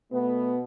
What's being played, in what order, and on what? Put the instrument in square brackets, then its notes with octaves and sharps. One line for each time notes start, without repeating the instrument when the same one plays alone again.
[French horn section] B2 A3 B3